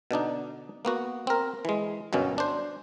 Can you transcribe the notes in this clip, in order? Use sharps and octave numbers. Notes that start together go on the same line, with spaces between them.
B2 D3 D4 D#4
A#3 B3 F#4
C4 A#4
E3 G#3
G1 F#2 B2 C#4
D4 C5